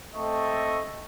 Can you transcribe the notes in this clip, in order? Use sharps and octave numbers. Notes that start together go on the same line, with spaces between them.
A3 C4 A4 D#5 A5 C#6